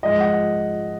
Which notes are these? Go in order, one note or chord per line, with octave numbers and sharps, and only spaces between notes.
G#2 F3 G#3 D#5
F#5